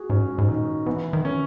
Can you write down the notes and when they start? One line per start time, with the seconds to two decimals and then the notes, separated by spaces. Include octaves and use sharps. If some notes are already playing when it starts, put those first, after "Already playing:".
Already playing: F#4 G#4
0.10 G#2 C#4
0.38 G#2
0.48 A#2 D#3
0.86 B2 E3
1.13 D#3
1.25 C#4